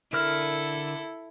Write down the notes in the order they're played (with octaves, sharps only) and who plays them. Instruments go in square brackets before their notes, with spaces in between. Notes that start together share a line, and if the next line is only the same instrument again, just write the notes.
[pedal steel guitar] D3 A#4 F6 [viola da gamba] E4 A4